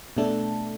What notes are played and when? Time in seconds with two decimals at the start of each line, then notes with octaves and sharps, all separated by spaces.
0.17 B2 A3 D4 A4